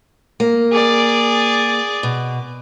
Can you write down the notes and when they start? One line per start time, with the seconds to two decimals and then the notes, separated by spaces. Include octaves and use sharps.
0.40 A#3
0.72 G#4 D5
2.03 B2